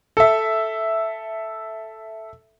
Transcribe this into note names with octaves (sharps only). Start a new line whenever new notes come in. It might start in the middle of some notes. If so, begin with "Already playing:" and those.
A4 E5